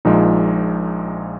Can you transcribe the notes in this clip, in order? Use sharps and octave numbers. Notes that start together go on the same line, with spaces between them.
A#1 A#2 F3 G#3 D#4